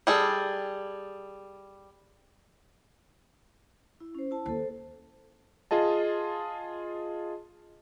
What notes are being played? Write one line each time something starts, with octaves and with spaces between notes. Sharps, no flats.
G3 G#4 A4
E4
C#4 C5
E4 A5
D#2 A#3 A4 C5
F4 G#4 D#5 A5